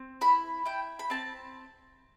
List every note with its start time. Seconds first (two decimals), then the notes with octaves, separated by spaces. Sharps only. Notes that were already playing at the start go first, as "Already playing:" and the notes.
Already playing: C4
0.21 E4 B5
0.65 E4 G5
0.99 B5
1.10 C4 A5